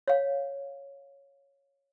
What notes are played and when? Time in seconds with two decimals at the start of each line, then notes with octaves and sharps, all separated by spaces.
0.08 C#5 F5